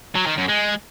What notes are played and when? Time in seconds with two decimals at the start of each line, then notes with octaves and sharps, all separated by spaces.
0.16 F#3
0.27 D#3
0.38 F#2
0.49 G#3